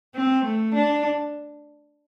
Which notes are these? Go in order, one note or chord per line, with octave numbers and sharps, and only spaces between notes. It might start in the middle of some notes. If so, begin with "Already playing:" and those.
C4
A3
D4